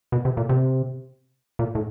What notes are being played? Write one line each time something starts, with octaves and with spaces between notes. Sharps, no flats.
B2
C3
A#2
C3
A#2
A2